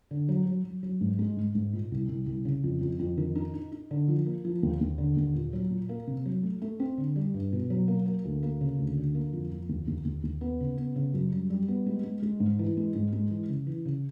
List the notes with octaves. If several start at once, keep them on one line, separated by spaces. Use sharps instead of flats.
D3
F#3
F#3
F#3
F#3
G#2
G#3
G#2
G#2
A#2
C2
C2
C2
C#3
F2
F2
F2
D#3
D#4
D#4
D#4
D3
F3
A#3
F3
D#2
D#2
D3
D#2
A#2
F#3
A#2
A#3
C3
F#3
A3
A3
C4
D3
G3
G2
B2
F#3
A#3
A#3
D2
A#3
C#3
D2
D3
A#3
F2
F2
D#2
D#2
D#2
D#2
B3
C#3
B3
C#3
F#2
G3
G3
B3
G#3
G#3
G#3
G#2
E3
G#3
G#2
G#3
E3
C#3
E3
C#3